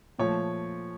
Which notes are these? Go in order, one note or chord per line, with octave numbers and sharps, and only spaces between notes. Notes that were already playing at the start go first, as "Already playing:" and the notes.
A#2 F3 A3 C#5